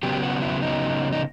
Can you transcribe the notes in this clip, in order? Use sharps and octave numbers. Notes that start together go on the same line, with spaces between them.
C#3 F#3 B3 G4
F#4
E4
D#4
D#4